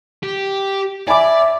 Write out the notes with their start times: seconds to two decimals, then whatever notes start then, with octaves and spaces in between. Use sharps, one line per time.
0.23 G4
1.08 D5 E5 G#5 B5 D6